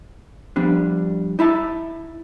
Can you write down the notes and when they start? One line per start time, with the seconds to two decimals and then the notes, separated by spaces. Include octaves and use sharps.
0.56 F3 G3 B3 D4
1.39 D#4 E4 E5 A5